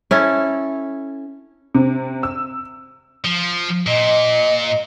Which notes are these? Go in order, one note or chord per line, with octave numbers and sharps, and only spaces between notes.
C#4 E4 A4
C3
E6
F3
A#2 D#5